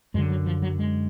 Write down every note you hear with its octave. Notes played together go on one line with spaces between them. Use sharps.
F#2 D3 G#3
F#3
F3
F#3
G#3